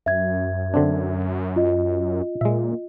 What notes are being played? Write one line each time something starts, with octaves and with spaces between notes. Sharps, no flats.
F#2 E5 G#6
D3 C4 D4
F4 D#5
A#2 G#3 E5